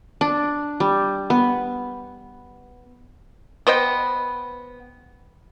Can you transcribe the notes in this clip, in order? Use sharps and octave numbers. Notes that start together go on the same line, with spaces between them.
D4
G3
B3
B3 C5 D#5 G5